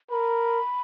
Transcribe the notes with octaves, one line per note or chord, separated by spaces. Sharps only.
A#4 B5